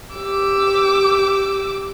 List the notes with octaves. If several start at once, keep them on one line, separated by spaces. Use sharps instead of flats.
G4 D6 E6